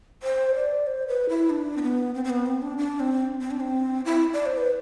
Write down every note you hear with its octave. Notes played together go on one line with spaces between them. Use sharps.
C5
D5
C5
B4
E4
D4
C4
B3
C4
C4
B3
C4
D4
D4
C4
C4
D4
C4
E4
D5
C5
B4